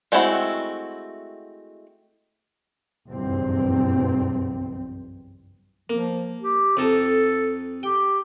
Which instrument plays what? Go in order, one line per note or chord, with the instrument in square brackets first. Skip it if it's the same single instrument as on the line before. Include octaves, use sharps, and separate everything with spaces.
[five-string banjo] G#3 A3 C4 E4 F#4
[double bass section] F#1 B1 E2 G2 C4
[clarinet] F3 [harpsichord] A#3
[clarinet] G4
[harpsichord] F2 D#4 A5 [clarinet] A4
[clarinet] G4 [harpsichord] G5